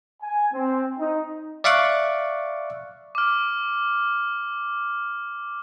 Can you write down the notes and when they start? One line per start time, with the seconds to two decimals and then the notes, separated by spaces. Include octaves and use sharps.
0.22 G#5
0.53 C4
0.99 D#4
1.64 D5 E5 F5 C#6 D6 F#6
3.15 D6 F6